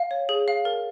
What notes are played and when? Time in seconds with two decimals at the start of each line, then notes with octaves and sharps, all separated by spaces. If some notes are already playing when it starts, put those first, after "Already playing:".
Already playing: F5
0.11 C#5
0.29 G#4
0.48 F5
0.65 A#4